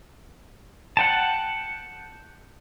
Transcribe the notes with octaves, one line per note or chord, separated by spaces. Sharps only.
F#5 G5 A5